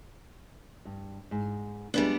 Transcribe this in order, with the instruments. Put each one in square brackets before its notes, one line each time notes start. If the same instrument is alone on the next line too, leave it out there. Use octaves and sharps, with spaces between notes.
[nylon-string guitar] G2
G#2
[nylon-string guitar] F2 G#3 B4 [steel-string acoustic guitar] G3 B3 D4